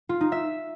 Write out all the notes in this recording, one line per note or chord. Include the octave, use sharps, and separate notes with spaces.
F4
D#4
E5